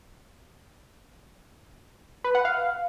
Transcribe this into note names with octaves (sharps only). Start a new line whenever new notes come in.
B4
F#5
F5